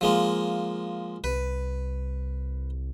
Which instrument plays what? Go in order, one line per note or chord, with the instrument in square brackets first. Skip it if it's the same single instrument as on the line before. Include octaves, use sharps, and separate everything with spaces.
[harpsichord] F3 G#3 A#3
[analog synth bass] C2 [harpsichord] B4